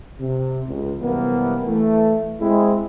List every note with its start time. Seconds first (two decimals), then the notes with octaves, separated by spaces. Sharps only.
0.20 C3
0.67 C#2
0.99 F#2 C3 E3 G3 A#3 B3
1.66 E3 A3
2.41 G#3 C4 E4